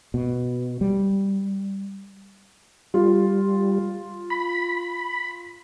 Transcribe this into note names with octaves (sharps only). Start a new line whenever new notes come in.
B2
G3
G3 F4
B5